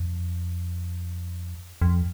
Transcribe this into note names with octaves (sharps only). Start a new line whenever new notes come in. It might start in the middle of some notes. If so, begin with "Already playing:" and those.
Already playing: F2
F2